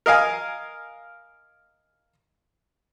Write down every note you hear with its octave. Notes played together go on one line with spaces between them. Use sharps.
A#4 D#5 F5 G#5